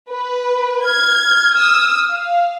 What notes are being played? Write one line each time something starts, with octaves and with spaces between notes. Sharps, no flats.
B4
F6 G#6
D#6 E6
F5